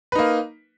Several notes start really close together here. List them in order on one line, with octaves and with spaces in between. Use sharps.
B4 D#4 A#3